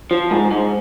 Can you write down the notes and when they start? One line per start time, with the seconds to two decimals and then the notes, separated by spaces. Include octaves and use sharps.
0.11 F3
0.31 G#2
0.51 G#2